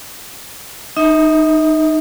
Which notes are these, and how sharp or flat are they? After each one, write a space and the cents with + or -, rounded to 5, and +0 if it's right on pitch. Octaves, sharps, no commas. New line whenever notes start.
D#4 -15 E5 -45